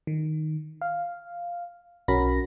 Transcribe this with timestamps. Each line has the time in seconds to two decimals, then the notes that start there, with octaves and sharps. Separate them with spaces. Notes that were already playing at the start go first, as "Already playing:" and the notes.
0.07 D#3
0.82 F5
2.08 B1 C#4 F#4 A#4 B5 A#6